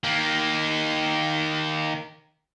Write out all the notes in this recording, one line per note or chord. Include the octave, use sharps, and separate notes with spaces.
D#3 A#3